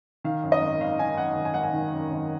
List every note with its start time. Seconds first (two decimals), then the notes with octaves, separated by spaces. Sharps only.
0.24 D#3 F5
0.44 F#2
0.52 D#5
0.62 G#1
0.81 G#1 F5
0.99 D#3 G#5
1.17 F#2 F#5
1.36 G#1
1.45 G#5
1.54 G#1 F#5
1.63 G#5
1.73 D#3
1.92 F#2
2.11 G#1